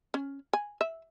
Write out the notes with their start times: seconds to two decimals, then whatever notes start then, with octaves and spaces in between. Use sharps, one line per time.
0.14 C#4
0.53 G#5
0.81 E5